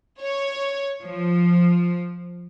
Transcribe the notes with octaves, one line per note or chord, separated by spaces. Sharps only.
C#5
F3